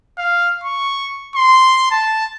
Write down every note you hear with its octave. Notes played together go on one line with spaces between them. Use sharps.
F5
C#6
C6
A5